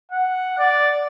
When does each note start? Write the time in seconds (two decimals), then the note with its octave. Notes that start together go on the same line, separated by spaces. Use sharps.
0.12 F#5
0.59 D5